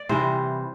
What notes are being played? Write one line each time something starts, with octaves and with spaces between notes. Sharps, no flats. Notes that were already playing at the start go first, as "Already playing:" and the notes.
Already playing: D5
C3 E3 G3 C5